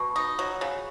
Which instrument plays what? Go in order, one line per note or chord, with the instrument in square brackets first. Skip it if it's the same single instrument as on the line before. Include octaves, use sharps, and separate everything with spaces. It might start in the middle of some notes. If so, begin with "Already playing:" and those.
Already playing: [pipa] B2 [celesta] B5 C#6
[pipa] D#4 [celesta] D#6
[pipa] F#3
C#3